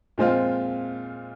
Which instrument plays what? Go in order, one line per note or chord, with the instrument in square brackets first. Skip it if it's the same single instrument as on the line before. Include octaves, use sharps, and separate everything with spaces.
[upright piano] A#2 F3 G#3 C4 F4